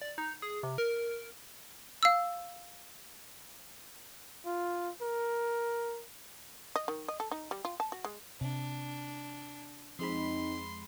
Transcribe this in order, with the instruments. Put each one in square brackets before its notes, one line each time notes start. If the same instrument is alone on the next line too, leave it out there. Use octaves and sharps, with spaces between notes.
[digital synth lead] D5
D#4
G#4
C3
A#4
[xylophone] F5 E6
[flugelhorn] F4
A#4
[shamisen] D#5
D#3
D#5
A4
D#4
G3
F4
A5
F#4
G#3
[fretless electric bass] C3 [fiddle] D4
[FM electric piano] F2 G#3 B5 [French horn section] C4 D#4 [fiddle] C6